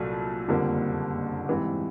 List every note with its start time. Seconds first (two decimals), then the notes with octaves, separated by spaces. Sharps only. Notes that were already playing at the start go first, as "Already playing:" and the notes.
Already playing: C2 A#2 F#3 A3
0.48 F#1 F2 D3 G3 A#3
1.48 G#2 E3 G3 C4